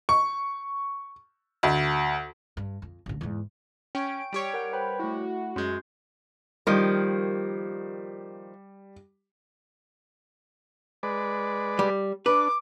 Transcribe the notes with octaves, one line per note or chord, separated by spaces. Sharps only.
C#6
D2
G2
F2
A1 D3
E2 G#2
C#4 G5 C#6 D7
G3 G4 C#5
A#4 F#5
B4 C5 G5 B5
A3 E4 F#4
F#2 G#3 C#4 C6 G6
D#3 F3 G3 A#3
G#3 B4 D5
G3
D4 B4 D6